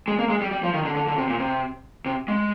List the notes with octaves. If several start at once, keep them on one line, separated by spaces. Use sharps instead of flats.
G#3
A#3
G#3
G3
G3
F3
D#3
D3
D3
D3
C3
A#2
C3
C3
G#3